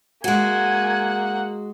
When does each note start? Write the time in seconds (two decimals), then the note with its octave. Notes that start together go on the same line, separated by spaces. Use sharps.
0.24 G#3 A#3 F#4 F#5 G#5